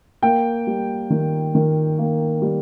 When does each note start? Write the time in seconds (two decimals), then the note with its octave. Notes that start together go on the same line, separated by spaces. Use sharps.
0.22 A#3 G5
0.67 G3
1.10 D#3
1.55 D#3
1.99 A#3
2.42 G3